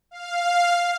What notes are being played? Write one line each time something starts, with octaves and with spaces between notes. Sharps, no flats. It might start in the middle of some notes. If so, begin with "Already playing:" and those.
F5